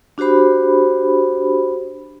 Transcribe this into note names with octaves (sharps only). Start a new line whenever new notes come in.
D4 F#4 G4 C5 B5